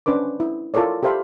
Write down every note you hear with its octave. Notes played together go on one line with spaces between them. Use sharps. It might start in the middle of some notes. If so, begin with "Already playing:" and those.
C#4 D4 B4 C5 D6
E4
E4 F4 A4 A#4 C#5 D5
G4 A4 C5 E5 F5 B5